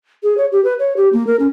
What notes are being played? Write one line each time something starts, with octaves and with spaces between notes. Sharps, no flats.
G#4
C#5
G4
B4
C#5
G4
A#3
A#4
C#4